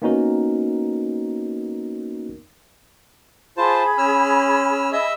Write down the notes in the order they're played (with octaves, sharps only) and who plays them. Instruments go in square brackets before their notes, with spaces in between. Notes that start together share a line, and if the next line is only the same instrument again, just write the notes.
[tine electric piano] A#3 B3 C#4 D#4 F#4 A#4
[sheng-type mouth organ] F4 C5 A5 [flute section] G#4 B5
[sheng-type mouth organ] C#4 E6 F6
D#5 E5 E6